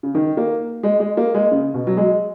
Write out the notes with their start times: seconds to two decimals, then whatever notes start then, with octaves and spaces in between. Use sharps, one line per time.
0.03 C#3
0.15 D#3
0.37 A#3
0.83 G#3
1.00 G#3
1.17 A#3
1.34 G#3
1.52 C#3
1.74 B2
1.87 F#3
1.97 G#3